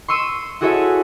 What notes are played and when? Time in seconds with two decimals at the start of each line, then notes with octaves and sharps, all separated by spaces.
0.08 C6 C#6 E6 D#7 E7
0.61 E4 F#4 G#4 A4 C#5 E5